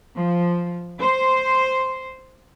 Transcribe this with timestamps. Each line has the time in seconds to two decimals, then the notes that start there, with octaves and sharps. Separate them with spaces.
0.16 F3
1.02 C5